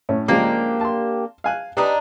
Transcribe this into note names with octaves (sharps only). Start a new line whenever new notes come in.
A2 C#4
C#3 F3 G#3 A#3 D4 G4
A5 C6
F5 G#5 F#6
D4 D#4 G4 B4